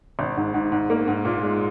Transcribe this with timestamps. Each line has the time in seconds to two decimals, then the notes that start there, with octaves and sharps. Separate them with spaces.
0.19 G#1
0.37 G#2
0.54 G#2
0.72 G#2
0.90 A#3
1.08 G#2
1.25 A#2
1.43 G#3